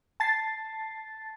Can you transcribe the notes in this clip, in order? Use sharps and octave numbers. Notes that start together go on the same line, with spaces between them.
A5 A6 C7